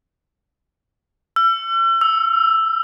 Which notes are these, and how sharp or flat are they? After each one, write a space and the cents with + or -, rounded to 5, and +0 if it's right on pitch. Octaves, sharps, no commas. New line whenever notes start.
E6 +40
E6 +5